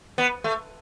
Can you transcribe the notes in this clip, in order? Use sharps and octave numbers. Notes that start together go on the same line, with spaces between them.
B3
A3